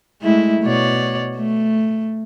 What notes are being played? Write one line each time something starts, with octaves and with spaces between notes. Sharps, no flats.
G#3 A3 E4
B2 C#5 D5
A3